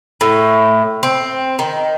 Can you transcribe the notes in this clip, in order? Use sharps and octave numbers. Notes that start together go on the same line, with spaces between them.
A2
C4
D#3